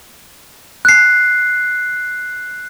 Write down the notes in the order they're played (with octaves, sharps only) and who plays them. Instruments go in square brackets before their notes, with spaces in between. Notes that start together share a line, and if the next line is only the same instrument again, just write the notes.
[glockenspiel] F#6 C7